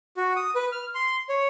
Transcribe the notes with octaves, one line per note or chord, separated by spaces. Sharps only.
F#4
D#6
B4
F6
C6
C#5